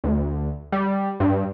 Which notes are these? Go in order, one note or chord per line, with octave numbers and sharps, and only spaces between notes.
D2
G3
G2